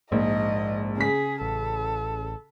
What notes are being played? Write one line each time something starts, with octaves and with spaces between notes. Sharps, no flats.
A#1 G#2 D#5
C#3 G#4 B6
A1 A4